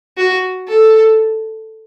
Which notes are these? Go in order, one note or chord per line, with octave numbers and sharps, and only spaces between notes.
F#4
A4